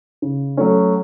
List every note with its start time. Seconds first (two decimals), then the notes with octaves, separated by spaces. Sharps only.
0.22 C#3
0.57 F#3 A3 C#4